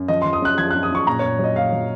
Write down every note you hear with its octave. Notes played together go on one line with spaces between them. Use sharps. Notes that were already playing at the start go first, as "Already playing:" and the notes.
Already playing: F#2
F3 D#5
C6
F3
D#6
F#2 F#6
F3 G#6
F#6
F#2
D#6
F#2 C#6
A#2 A#5
C#5
A#2
F#3 D#5
A#2 F5
F#3